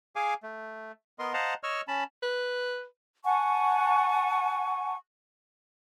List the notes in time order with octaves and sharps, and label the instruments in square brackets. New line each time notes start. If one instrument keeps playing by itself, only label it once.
[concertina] G#4 F5 G#5 D6
A3
B3 A#4 D#5 C6
C5 D#5 F5 F#5 A5 A#5
C#5 D#5 C#6 E6 F6
C#4 A5 B5
[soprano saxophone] B4
[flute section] F#5 G#5 A5 C#6